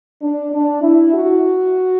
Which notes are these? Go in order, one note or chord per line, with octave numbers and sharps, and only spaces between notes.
D4
D4
E4
F#4